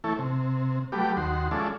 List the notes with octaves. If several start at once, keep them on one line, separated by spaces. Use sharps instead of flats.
E3 A3 E4 A4 C#5
C3
F#3 G3 A3 G4 B4 D6
D#2 F#4 C6
F3 G#3 C#4 A4 D5 E5